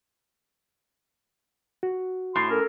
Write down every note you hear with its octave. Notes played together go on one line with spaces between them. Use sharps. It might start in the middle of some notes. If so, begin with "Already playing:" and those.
F#4
A2 C6
C#4 A4 A#4